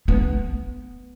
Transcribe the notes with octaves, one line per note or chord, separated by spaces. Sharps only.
B3